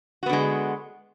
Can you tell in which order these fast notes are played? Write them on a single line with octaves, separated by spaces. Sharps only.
F#4 B3 D3 G#3